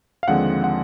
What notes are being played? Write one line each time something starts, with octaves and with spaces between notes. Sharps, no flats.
F5
D#2 D3 F3 G#3 C4 F#5
F#5